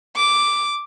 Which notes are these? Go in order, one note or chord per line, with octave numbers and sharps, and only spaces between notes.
D6